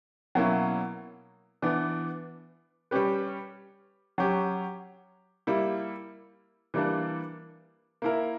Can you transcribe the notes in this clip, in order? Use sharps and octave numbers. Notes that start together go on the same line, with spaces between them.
B2 F#3 A#3 C#4 E4
E3 B3 D4
G3 C#4 G4 B4
F#3 C#4 G4
G3 A#3 E4
E3 G3 A#3 D4
A#3 E4 A#4